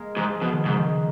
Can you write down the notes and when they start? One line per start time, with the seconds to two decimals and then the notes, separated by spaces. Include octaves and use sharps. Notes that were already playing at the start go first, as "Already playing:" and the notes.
Already playing: G#3 A#3
0.17 G#2 F3
0.41 B2 F3
0.53 D#3
0.65 G#2 C#3
0.77 D#3
0.89 D#3